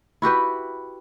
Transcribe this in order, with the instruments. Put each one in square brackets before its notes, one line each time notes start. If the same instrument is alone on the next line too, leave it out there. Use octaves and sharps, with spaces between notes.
[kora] E4 F#4 G4 B4